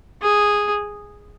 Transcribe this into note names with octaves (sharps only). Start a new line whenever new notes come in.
G#4